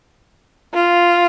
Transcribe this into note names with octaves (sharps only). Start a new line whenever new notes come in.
F4